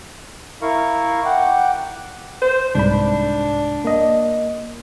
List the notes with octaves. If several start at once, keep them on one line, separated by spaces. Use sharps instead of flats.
E4 A#4 F5 C#6
F#5 G5 D6
C5
C2 G#2 D4 B5
A#3 D#5